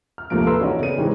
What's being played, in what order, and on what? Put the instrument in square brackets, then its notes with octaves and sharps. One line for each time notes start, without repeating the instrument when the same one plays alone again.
[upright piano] F6
D#2 C3 F3 A3 A#3 D7
F4 A4 B4 A#5 C6 E6
E3 C#4 D#4 F#4 D5 D#5
C#3 B3 C#4 G#4 D#7
D#3 E3 G#3 C4